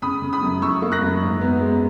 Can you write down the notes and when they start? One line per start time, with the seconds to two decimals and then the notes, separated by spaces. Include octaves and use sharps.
0.02 C#3 B5 D#6
0.22 C#3
0.33 B5 D#6
0.42 F#2
0.62 F#2 C#6 E6
0.82 A#3
0.92 F#6 A#6
1.02 F#2
1.22 G#2
1.41 B3
1.61 G#3